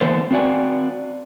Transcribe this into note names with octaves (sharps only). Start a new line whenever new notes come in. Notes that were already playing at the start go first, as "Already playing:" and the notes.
D3 E3 A#3 B3 A4 C5
C4 F#4 D5 G#5